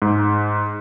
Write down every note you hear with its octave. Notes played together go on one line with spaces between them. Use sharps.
G#2